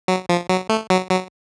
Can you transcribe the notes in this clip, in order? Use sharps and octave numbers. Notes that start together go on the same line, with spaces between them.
F#3
F3
F#3
A3
F#3
F#3